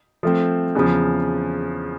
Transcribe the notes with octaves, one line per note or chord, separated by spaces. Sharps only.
F3 A3 C4
E2 C#3 F3